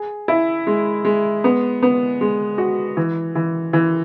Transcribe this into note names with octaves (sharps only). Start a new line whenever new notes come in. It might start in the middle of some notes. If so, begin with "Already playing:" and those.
Already playing: G#4
E4
G#3
G#3
B3
B3
G#3
F#4
E3
E3
E3